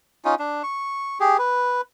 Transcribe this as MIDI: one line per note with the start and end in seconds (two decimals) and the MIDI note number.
0.25 0.35 61
0.25 0.35 63
0.25 0.35 65
0.39 0.63 62
0.63 1.18 85
1.20 1.37 67
1.20 1.37 68
1.39 1.81 71